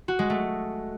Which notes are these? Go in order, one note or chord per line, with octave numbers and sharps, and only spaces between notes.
F#4
G#3
A3